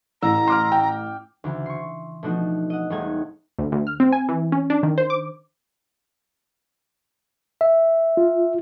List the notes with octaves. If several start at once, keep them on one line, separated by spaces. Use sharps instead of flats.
A1 A#5 E6
C6 D6 F6
G5
D2 C#3 E3
C6 C#6
B2 F3 A3 D4 D#4 F#4
D#5 F#5
E1 G3 A3 D#4 F#5 G#6
D2
D2
F6
C4
G#5
E3
C#4
D4
D#3
C5
D6
E5
F4